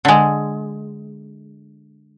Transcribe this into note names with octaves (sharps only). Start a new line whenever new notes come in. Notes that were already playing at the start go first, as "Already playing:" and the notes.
D3 G#3